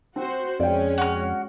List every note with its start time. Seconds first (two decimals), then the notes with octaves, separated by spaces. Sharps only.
0.16 C4 F#4 C5
0.60 F2 G#3 C#4 D5 G5
0.98 F#4 F6